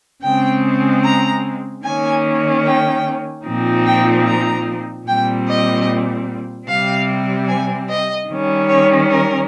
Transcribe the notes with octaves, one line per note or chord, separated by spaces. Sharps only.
C#3 G#3 C4 G5
A#5
D#3 A#3 C#4 G#5
G5
A#2 F3 C4 D#4
G5
A#5
A#2 G3 C4 G5
D#5
C3 G3 C4 F5
G#5
D#5
D#3 G3 C#4
C#5
A#4